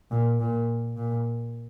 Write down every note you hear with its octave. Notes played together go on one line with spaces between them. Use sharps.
A#2
A#2
A#2